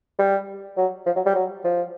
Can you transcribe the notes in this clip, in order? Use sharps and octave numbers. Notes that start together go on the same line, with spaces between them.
G3
F#3
F3
F#3
G3
F#3
F3